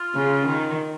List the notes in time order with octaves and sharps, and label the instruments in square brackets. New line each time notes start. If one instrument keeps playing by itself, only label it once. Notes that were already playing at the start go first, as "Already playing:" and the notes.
Already playing: [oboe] F4
[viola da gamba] C#3
D#3